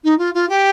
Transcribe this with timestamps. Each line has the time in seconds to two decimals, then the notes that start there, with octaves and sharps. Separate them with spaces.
0.04 D#4
0.18 F4
0.34 F4
0.49 G4